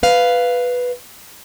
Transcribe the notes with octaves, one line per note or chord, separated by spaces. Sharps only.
B4 F5